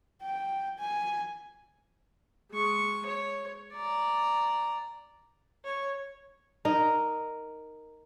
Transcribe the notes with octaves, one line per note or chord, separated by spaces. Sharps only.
G5
G#5
G#3 C#6
C#5
D5 A#5
C#5
D#4 A#4